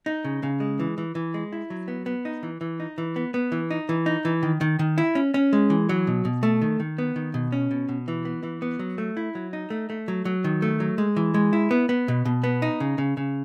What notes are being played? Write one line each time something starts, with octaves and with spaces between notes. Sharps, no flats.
D#4
C#3
C#3
G#3
E3
E3
E3
G#3
E4
F#3
B3
B3
D#4
E3
E3
D#4
E3
B3
B3
E3
D#4
E3
D#4
E3
D#3
D#3
D#3
E4
C#4
C#4
G#3
E3
F#3
B2
B2
A3
D#3
D#3
B3
D#3
B2
C#4
B2
B2
E3
B3
E3
B3
F#3
A3
E4
F#3
D#4
A3
A3
F#3
F#3
D#3
A3
F#3
G#3
E3
G#3
E4
B3
B3
B2
B2
B3
D#4
C#3
C#3
C#3